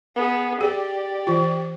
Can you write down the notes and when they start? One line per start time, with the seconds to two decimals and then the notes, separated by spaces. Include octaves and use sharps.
0.16 B3 G#4
0.61 G4 G#4 D5
1.27 E3 F4